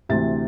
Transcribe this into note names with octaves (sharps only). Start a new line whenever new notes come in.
D2 C3 E3 A6